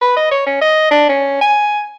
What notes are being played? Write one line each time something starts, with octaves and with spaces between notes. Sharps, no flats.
B4
D#5
C#5
C#4
D#5
D4
C#4
G#5